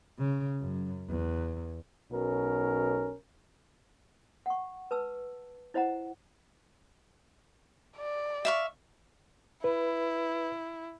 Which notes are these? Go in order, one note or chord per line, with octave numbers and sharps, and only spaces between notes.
C#3
F#2
E2
B1 B2 C#4 A#4
F#5 C#6
B4 A5 E6
E4 C5 D#5 F#5 A#5
D5
E5 F5 C#6
E4 B4